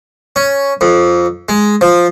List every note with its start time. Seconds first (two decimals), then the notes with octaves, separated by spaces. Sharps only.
0.36 C#4
0.81 F2
1.49 G#3
1.81 F3